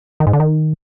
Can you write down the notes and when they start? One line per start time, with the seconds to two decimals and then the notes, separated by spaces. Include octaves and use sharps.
0.20 D#3
0.27 G#2
0.33 D3
0.40 D#3